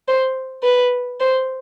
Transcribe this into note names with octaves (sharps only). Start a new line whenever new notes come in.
C5
B4
C5